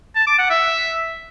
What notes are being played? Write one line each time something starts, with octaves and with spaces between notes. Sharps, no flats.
A5
D6
F#5
E5